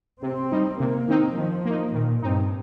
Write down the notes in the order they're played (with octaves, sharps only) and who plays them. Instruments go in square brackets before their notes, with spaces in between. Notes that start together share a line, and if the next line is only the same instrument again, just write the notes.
[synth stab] C3 [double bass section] C4
[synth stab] G3 D#4
[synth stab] C3 [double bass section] A#3
[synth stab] D#3 C4 D#4
[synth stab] D#3 [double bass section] F3
[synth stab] A#3
D#4
[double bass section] A#2 [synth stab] D#3
[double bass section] G2 [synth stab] C4 D#4